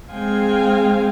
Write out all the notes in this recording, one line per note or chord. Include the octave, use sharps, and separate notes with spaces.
G#3 C4 G#4 F5 G5 G#5